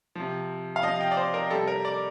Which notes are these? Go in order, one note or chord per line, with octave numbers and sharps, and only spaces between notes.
C3 F3
F5
C3 F3 D#5
G5
D5
C5
A#4
C3 G3 A4
A#4
D5